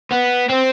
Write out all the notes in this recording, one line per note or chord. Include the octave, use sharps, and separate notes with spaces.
B3
C4